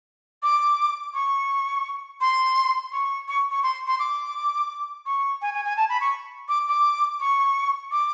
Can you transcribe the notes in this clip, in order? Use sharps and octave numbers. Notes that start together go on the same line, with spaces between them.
D6
C#6
C6
C#6
C#6
C#6
C6
C6
D6
C#6
G#5
G#5
G#5
A5
B5
C#6
D6
D6
C#6
D6